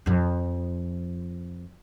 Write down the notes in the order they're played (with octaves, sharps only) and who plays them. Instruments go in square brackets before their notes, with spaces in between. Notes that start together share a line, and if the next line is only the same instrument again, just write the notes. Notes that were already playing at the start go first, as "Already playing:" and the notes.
[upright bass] F2 F3